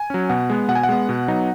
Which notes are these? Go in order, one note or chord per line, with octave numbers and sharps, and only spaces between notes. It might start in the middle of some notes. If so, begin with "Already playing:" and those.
Already playing: G#5
F#3 C#4
B2 F#5
G#3 B3
B2 F#5
G#5
F#5
G#3 B3
B2
F#3 B3 D#4